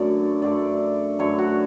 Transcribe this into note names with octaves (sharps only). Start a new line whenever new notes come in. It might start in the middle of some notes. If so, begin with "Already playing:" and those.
Already playing: F#2 D3 A3 D5
F#2 D3 A3 D5
F#2 D3 A3 C#5
F#4